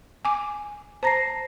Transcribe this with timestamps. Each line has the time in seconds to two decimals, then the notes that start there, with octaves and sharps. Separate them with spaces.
0.25 G#5 D6
1.03 C5 A5 A#5 A#6 C7